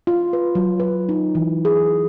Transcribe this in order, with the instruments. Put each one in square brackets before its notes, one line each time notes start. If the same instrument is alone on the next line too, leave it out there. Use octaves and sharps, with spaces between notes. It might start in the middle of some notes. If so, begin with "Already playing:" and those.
[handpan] F4
B4
F#3
B4
D#4
E3
G#4